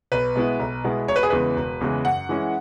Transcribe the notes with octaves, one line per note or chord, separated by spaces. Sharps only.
B1 B4
B2 G#3 B3 E4
B1
B2 G#3 B3 E4
E1 C#5
B4
G#4
E2 C#3 E3 G#3 B4
E1
E2 C#3 E3 G#3
F#2 F#5
E3 G#3 C#4 E4